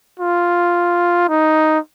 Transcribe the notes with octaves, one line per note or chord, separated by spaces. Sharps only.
F4
D#4